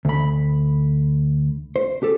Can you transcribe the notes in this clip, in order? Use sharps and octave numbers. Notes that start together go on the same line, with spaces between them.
D2 B5
C5
G4 A4